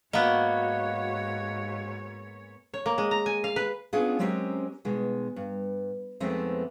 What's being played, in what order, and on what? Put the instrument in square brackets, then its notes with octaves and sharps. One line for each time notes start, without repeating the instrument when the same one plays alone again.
[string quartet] G#2 C#5 [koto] A#3 B3 [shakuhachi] F#4 [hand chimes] D#5 F5 F#6
[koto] C#5
A#3
G#3
A#5
G#5
F5
B4
[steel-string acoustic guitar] B3 C#4 D4 F4 G#4
F#3 G#3 C4 C#4 G4 A#4
B2 D#3 G#3
G2
F2 D#3 G#3 A3 B3 C4